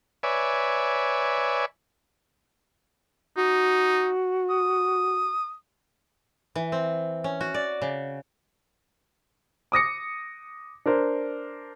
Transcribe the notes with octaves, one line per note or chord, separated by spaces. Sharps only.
B4 C#5 D5 E5 G#5
D#4 F#4
D#6
E3
C4
C#4
F#4
D5
C#3
D6 D#6 A#6 C#7
D4 A#4 C5